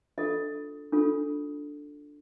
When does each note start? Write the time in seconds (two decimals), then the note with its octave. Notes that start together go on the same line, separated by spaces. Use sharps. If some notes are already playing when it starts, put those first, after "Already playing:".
0.18 D4 F4 A4 D#5
0.93 D4 F4 A4